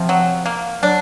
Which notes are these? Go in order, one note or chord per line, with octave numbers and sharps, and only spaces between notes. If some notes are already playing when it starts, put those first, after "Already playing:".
Already playing: C3 F3
F#3
A#3
F#3 D4